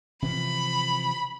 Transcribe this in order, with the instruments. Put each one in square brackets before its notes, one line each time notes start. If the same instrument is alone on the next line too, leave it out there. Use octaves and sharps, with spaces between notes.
[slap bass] C3 E3 F3 [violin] B5